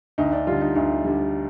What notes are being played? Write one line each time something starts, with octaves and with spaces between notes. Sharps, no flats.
D2 D#4
D4
D3 G3 F4
D#4
D2 D#4
D3 G3